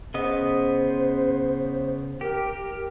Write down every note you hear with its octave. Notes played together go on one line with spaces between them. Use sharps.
C#3 B3 C5 D#5
G4 A#4